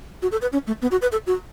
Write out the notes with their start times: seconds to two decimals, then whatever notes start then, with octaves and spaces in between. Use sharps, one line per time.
0.22 F#4
0.32 A4
0.42 B4
0.53 C#4
0.67 A3
0.82 B3
0.91 F#4
1.02 B4
1.12 A4
1.27 F#4